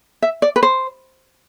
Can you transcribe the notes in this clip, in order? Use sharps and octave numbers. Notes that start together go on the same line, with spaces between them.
E5
D5
B4
C5